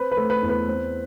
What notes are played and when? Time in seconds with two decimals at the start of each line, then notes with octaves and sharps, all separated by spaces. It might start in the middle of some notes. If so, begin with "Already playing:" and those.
Already playing: C4 B4
0.12 B4
0.17 A3
0.30 B4
0.43 E2
0.49 B4
0.68 C4